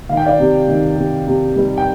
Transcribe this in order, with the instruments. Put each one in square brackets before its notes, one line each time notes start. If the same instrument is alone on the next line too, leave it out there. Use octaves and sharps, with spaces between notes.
[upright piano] D#3 F5
G5
D5 F5
C3
D#3
C3
C3
G3
G5